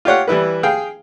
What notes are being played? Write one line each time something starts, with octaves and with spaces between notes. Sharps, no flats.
F4 G4 C#5 F#5
E3 G3 E4 B4
G#4 F5 G5